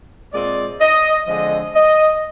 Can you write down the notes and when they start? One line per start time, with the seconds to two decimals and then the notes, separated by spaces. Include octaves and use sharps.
0.32 A#2 G#3 C4 D5
0.80 D#5
1.27 D3 F3 G#3 C4 D#5
1.75 D#5